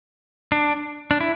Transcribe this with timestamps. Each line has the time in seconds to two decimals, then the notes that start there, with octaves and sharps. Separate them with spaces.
0.52 D4
1.11 D4
1.21 E4